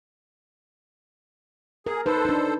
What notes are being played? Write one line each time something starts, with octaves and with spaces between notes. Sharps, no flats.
G#4 A#4
D#4 A4 B4 C5
D4 D#4